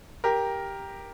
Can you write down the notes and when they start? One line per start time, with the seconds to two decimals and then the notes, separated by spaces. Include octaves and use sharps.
0.24 G4 A#4